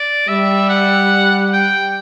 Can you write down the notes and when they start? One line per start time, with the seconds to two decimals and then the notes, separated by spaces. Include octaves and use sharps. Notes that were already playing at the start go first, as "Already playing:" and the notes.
Already playing: D5
0.28 G3 E5
0.69 F#5
1.53 G5